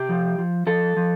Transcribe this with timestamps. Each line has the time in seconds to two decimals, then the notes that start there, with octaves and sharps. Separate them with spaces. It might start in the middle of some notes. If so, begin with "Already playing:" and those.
Already playing: C3 G4
0.09 F3
0.38 F3
0.67 F3 A4
0.97 F3